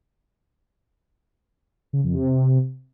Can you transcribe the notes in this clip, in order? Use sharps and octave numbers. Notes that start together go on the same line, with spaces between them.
C#3
F2
C3